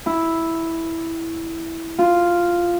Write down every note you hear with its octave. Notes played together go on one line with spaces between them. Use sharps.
E4
F4